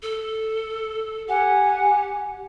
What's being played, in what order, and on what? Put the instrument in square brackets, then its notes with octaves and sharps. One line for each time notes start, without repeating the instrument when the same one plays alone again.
[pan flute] A4
[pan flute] G4 [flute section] F#5 G#5